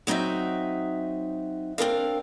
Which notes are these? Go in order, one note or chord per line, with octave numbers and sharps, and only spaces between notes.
F#3 C4 D#4 F#4 E5
C4 D4 A#4 F5